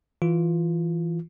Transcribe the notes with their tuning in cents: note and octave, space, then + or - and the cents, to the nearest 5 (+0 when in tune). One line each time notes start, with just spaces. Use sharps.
E3 +0 F4 +0